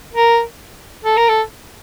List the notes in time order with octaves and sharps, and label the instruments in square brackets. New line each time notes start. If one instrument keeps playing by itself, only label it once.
[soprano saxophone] A#4
A4
A#4
A4